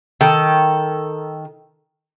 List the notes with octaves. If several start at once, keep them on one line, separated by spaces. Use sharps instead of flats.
D#3 A4